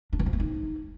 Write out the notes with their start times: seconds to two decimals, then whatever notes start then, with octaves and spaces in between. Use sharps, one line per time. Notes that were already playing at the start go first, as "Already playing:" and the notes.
0.13 D4
0.19 E3
0.26 F3
0.33 B3
0.40 D#4